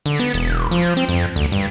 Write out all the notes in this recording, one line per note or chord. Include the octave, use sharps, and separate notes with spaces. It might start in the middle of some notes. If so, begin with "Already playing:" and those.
D3
B3
E1
F3
C4
F2
D2
G2